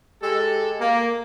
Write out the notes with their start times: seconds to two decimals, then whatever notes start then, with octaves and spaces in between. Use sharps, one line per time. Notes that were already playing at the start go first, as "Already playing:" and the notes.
0.22 G#3 G4 A4
0.80 A#3